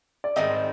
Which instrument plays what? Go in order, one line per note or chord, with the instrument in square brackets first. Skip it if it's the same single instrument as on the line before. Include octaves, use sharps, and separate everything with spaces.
[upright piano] D5
[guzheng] G#2 D#3 G3 C4 [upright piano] D#5